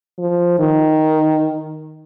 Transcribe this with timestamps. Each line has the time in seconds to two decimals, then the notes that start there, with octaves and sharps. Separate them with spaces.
0.18 F3
0.59 D#3